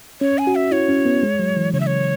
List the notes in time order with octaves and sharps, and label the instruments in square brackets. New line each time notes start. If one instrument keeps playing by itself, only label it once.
[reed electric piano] C#4 [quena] C#5
[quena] G#5
[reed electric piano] F#4
[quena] E5
[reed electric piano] E4 [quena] C#5
[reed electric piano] C#4
B3
G#3
F#3
E3
[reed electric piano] C#3 [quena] C#5
[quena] E5
C#5